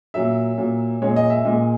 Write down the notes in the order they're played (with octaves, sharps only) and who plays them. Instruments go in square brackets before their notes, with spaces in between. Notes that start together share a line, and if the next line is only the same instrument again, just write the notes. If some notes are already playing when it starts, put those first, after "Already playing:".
[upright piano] A#2 F#3 E5
A#2 F#3
A#2 G#3 C#5
D#5
E5
A#2 G#3 D#5